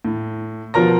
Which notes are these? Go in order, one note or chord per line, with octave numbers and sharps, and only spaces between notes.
A2
B2 F3 F4 A#4 A#5 A#6